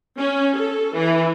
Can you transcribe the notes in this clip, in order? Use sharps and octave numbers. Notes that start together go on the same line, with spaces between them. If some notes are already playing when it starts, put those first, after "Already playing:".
C#4
A4
E3